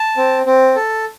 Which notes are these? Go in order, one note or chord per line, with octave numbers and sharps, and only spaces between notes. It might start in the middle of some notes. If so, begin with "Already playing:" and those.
Already playing: A5
C4
C4
A4